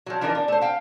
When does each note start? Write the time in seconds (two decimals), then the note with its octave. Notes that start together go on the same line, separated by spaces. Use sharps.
0.06 F3 F#3
0.21 E3 F3 D4 D#4 F4 A#4
0.35 D4
0.48 A3 C5
0.61 F5 G5